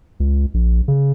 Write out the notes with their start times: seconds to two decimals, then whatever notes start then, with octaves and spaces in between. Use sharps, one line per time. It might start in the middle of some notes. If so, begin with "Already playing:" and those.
0.20 C#2
0.54 A#1
0.88 C#3